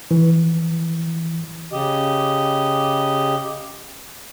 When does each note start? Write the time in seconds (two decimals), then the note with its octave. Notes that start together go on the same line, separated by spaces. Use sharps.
0.11 E3
1.72 C#3 G4 D#5